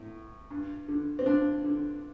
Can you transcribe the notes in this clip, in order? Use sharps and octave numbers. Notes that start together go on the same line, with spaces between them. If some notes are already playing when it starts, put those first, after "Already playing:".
Already playing: A2
G2
D3
C4
G2 D4
D3